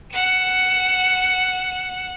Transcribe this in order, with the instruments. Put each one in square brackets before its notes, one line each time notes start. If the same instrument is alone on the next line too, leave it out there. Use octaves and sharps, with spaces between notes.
[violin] F#5 E7